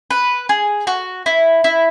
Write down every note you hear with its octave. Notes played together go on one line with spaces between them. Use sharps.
B4
G#4
F#4
E4
E4